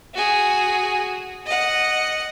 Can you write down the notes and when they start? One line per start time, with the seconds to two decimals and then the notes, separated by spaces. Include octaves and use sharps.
0.14 F#4 G#4
1.46 D#5 F#5